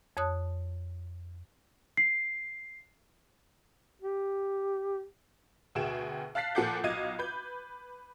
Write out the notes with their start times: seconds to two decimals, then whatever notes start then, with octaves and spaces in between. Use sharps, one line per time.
0.17 F2 C#5 A5 D#6 F#6
1.97 C7
4.01 G4
5.75 D2 B2 G#4 G5 E7
6.35 F5 A5 F#6 A6 B6 C7
6.55 A#2 F3 A4 F#5 D6 G6
6.83 B1 F4 D#5 G#6 D#7
7.19 B4 G6